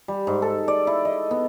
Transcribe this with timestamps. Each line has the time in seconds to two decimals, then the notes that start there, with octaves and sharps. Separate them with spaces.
0.08 G3
0.27 G#2
0.42 A4
0.68 D5
0.87 E4
1.05 D#5
1.31 B3